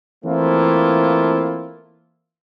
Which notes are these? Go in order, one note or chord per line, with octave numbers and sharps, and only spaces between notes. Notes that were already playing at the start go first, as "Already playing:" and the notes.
E3 A3 A#3 C4 E4 F4